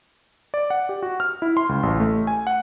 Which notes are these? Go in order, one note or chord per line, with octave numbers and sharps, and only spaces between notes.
D5
F#5
G4
F#4
F6
E4
C6
C#2
A1
A3
G#5
F#5